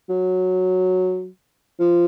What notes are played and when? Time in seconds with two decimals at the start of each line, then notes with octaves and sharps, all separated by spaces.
0.09 F#3
1.79 F3